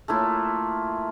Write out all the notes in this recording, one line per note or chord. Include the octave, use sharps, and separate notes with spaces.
A3 A#3 E4 F4